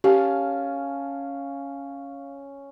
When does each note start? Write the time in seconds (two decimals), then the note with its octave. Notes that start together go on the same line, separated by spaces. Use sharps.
0.04 C#4 G4 F5 A5